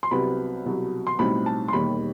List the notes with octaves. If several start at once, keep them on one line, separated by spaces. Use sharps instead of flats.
C6
C2 C3 F#3 B3 B5
C2 B2 F#3
C6
B1 A2 G3 C4 D#4 B5
A5
C6
E1 D#2 D#3 G3 B5